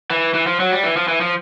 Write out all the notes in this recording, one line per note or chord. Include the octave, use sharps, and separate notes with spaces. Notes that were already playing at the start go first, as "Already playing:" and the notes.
E3
E3
F3
F#3
G3
E3
F3
E3
F3